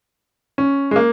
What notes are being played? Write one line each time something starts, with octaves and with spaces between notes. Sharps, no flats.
C#4
G#3
A#3